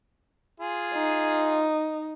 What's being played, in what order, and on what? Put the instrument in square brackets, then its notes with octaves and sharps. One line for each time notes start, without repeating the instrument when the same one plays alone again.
[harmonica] F4 G#4
[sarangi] D#4